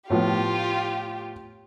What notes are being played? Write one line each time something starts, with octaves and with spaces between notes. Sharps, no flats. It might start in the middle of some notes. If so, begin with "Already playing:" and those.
A2 F3 B3 F4 G4